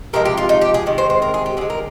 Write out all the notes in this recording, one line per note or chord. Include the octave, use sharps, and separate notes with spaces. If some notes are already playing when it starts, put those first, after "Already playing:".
C3 F3 G#3 A#4
G4
F4
D#4
G4
G#4
C3 D#3 G#3
C5
C5
A#4
G#4
G4
D3 G#3 G#4
A#4